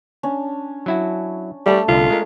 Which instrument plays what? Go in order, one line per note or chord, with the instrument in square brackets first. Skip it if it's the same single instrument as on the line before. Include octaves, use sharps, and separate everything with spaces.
[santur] C#4 D4
[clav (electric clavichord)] F#3 E4 F#4
[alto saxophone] G3 [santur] A3 A4 E6
[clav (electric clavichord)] C2 D3 [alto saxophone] F4
[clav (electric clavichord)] G#3 A#4